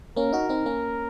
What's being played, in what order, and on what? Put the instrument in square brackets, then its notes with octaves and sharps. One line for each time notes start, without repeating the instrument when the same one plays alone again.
[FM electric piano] A#3 C#4 [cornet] A#4
[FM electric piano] D#4 F#4
C4 D#4
A#3 C#4